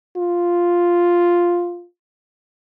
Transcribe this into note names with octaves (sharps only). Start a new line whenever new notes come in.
F4